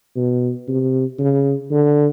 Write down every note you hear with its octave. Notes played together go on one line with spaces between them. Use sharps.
B2
C3
C#3
D3